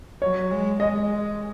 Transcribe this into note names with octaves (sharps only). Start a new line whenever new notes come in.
F#3 C#5
G#3
G#3 D#5